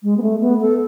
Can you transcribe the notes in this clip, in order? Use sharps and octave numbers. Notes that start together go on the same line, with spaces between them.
G#3
B3
A3
B3
A4